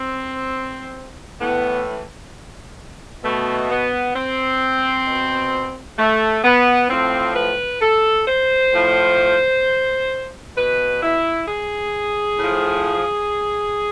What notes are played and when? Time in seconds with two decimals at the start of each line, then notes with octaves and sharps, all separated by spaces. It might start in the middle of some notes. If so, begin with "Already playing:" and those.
Already playing: C4
1.40 A2 E3 B3
3.24 B2 A3
3.70 B3
4.15 C4
5.07 B2
5.98 A3
6.44 B3
6.90 A2 F3 C4
7.36 B4
7.81 A4
8.27 C5
8.74 A2 F3
10.57 B2 B4
11.02 E4
11.48 G#4
12.39 A2 F3